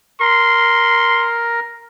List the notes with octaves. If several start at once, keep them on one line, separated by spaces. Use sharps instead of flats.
A#4 C6